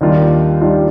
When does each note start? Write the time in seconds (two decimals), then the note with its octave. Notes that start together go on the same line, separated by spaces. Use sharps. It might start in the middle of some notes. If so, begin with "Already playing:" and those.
0.01 D#2 D#3 G3 D4 F4
0.61 D#2 D#3 G3 D4 F4